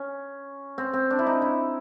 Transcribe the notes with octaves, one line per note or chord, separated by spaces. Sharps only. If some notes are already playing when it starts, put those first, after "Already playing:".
Already playing: C#4
C4
C4
D4
E4
D#4
E4